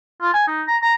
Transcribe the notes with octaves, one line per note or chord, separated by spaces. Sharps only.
F4
G#5
D#4
A#5
A#5